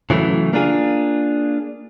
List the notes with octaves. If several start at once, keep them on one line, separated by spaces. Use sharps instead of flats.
C#3 E3 F#3 A3
A#3 D4 F4 G#4